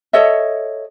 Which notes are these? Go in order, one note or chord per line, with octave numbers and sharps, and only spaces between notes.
A4 C#5 D#5 E5